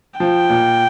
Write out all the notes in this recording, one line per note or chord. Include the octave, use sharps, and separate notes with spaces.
F3 G5
A#2